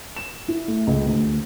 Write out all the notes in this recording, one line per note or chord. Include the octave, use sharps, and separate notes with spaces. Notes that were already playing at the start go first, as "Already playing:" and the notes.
E7
E4
A3
C#2
D2